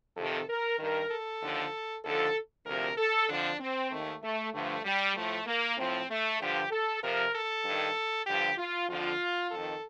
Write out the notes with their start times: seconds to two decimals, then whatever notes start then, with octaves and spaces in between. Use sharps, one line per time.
0.17 F2 C3 D#3 A4
0.48 A#4
0.79 G2 D#3 A#4
1.11 A4
1.41 D#2 D3 F3
2.04 D#2 D3 F3 A4
2.66 D2 C3 F3 A#4
2.97 A4
3.28 F2 D3 F3 D4
3.60 C4
3.91 D#2 D#3 A3
4.22 A3
4.53 G2 D3 F3 A3
4.85 G3
5.15 A2 F3 A3
5.47 A#3
5.77 A2 F3 C4
6.09 A3
6.40 G2 D3 F3 G4
6.71 A4
7.02 F2 C3 F3 A#4
7.34 A4
7.65 G2 D#3
8.27 G2 D3 F3 G4
8.58 F4
8.89 F2 D3 F3 F4
9.51 F2 D#3 A4